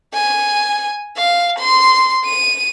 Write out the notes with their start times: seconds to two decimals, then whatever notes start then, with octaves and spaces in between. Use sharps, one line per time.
0.14 G#5
1.17 F5
1.59 C6
2.25 D#7